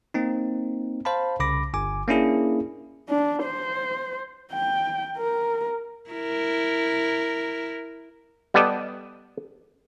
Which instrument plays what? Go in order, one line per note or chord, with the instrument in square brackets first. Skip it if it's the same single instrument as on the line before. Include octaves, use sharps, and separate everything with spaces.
[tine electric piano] A#3 C4 D#4
C5 F5 A5 B5
C2 C#3 B5 D6 A#6
G1 G#5 D6
A#3 C#4 D4 E4 G#4
[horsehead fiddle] D4
C5
G5
A#4
[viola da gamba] E4 A#4
[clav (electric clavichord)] G3 B3 G4 A4 D5 D#5